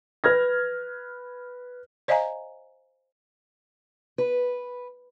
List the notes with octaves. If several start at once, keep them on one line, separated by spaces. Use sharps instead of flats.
B4 F6 G#6 A#6
C5 D5 D#5 F5 G#5 A#5
B4